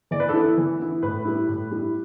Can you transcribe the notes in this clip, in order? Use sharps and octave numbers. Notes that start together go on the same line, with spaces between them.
E3 D5
B4
A4
B3 E4 B4
E3
B3 E4
A2 B4
G3 E4
A2
G3 E4